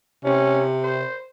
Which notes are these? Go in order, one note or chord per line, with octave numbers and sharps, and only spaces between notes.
C3 C#4
C5